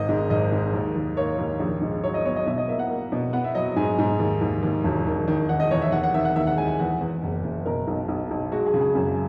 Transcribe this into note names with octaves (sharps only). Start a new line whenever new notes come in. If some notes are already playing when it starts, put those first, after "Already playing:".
Already playing: G#1 D#3 D#5
G#2
G#1 D#5
G#2
D#2
D#2
A#3 C#5
D#2
A#1
G#2
F#3 C#5
D#5
B3 C#5
D#5
B2 E5
D#5
A#3 E5
F#5
A#3
B2
B3 F#5
E5
F#3 D#5
G#2 G#5
G#2
D#2
D#2
D#2
E1
D#3
D#3
D#3 F#5
D#5
E2 C#5
E5
D#2 F#5
F#5
D#3 E5
F#5
D#2 E5
F#5
G#3 G#5
G#5
E2 F#5
E2
F#1
F#1
B2 A#4
B1
B1
B1
G#3 F#4
G#4
C#3
G#4
F#2